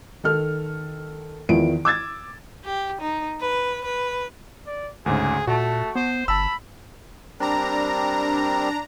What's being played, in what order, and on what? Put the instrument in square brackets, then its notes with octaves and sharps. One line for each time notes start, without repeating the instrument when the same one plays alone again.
[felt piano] D#3 A4 F6
E2 D#3 F3 E4 D7
D6 E6 G#6 A6
[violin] G4
D#4
B4
B4
[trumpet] D5
[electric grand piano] D2 G#2 C#3 [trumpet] G#4
[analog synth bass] A#2 [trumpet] A3 [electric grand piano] F#4 A5
[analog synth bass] B3 [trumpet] C5
[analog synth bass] G1 [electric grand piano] A5 E6 [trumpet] B5
[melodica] G3 C4 A#4 [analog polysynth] D4 A#5